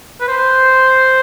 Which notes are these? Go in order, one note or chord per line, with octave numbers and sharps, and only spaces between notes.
B4
C5